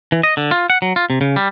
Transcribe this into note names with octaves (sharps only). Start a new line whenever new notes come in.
E3
D#5
D3
F4
F#5
F#3
F4
C3
C#3
G3